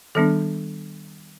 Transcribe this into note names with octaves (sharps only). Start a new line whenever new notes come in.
D#3 G3 B3 D4 A4